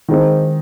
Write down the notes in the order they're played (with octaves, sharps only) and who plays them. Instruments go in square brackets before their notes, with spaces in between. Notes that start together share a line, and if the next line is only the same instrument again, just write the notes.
[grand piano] D#3 G#3 C4 D#4